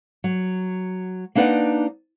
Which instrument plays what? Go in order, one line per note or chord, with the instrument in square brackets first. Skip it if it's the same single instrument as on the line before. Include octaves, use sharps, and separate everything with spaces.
[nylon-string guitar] F#3
A#3 D4 D#4 B4 D5 F#5